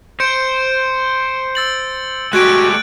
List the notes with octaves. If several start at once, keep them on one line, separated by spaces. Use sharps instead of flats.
C5 G6 C#7 D7
E6 A6 F#7
G#3 A3 F#4 G4 F#6 G#6 D7